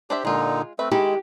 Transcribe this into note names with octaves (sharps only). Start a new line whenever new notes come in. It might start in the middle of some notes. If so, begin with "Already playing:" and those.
D4 G4 C5 E5
A#2 D3 G#3 D#4 F4
A3 C4 B4 E5
D#3 G#3 E4 G4